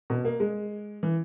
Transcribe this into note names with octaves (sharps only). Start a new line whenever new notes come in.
B2
A#3
G#3
E3